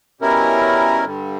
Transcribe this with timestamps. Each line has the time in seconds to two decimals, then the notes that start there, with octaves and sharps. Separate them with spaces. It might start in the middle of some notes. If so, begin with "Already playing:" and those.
0.21 B2 G3 C#4 E4 A#4
1.05 G2 D3 G3